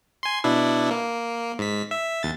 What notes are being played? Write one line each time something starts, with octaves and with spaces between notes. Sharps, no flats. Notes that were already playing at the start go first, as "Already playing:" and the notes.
G#5 C6
B2 D4 E4
A#3
G#2 B6
E5
D#2 A6